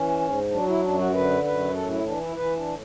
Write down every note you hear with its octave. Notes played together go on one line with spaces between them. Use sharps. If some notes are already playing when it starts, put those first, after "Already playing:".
Already playing: E3 C#4
G#2
F#3 D4
E4
F#2 D4
F#4
D3 B4
F#2 B4
A2 A4
E4
E3 D4
E4
E3 B4
D4
A2